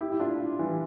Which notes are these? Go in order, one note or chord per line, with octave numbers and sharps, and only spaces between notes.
E4 G4
E4
D4 F4
E3 G3